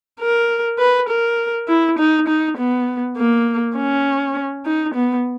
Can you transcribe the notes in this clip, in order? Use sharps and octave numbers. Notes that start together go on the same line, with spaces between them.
A#4
B4
A#4
E4
D#4
D#4
B3
A#3
C#4
D#4
B3